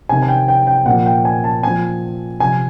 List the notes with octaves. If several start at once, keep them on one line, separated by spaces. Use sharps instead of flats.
C3 D#3 G#5
G#5
G5
G5
G5
A#2 F#5
F3
G5
G#5
A5
A#2 F3 G#5
C3 F3 G#5